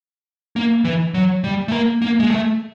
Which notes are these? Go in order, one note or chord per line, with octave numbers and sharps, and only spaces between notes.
A#3
E3
F#3
G3
A3
A#3
A#3
G#3
A3